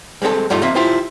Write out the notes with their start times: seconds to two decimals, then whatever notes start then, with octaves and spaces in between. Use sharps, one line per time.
0.22 G3 G#3 C4 F#4 A4
0.50 G2 G3 A3 D#4 F4
0.62 A#3 C4 E5
0.75 E4 F4 G4 C5